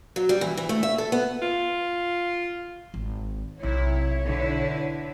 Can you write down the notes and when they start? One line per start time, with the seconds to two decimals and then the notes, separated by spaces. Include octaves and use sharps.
0.16 F#3
0.29 G3
0.41 E3
0.57 E3
0.69 A3
0.83 E5
0.98 A4
1.12 B3
1.42 F4
2.94 G#1
3.63 B1 C3 E4 C#5
4.26 B2 D3 D#4 E4 B4